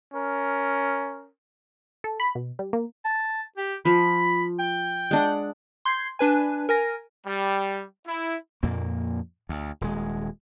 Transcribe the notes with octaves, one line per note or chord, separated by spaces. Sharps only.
C#4 A#4
A4
B5
B2
G3
A#3
A5
G4
F3 B5
G5
G#3 D4 F#5
C6 G6 G#6 C7
D4 B4 G#5
A#4 G#5 A#6
G3
E4
F2 A#2 A#3
D2
D#1 G#3